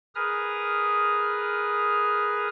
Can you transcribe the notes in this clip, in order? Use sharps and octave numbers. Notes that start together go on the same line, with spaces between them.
G#4 A#4 B4 D#6 F6